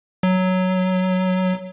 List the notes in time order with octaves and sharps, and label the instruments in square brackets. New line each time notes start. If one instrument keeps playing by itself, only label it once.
[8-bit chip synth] F#3